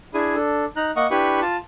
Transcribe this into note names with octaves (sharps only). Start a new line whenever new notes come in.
D4 E4 G#4 G#5
D4 A4
D#4 A#5 F#6
A#3 D#5 F#5 C#6
D4 E4 G4 B4 B5 C#6
F4 A5